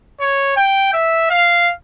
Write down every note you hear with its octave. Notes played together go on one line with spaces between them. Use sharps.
C#5
G5
E5
F5